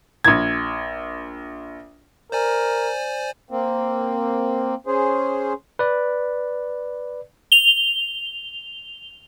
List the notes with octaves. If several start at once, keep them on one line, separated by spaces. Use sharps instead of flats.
A#1 G#6
A#4 C5 D5 G#5
A#3 C4
C#4 G#4 C5
B4 D5
F7 G7